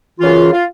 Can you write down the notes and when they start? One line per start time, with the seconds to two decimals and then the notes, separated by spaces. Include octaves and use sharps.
0.20 F#2 C#3 E3 F4
0.52 F4